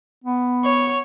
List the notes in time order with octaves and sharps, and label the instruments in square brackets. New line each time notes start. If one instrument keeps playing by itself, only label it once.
[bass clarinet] B3
[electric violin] C#5